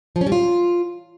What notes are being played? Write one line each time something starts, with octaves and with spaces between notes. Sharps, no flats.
F3
C#4
G3
F4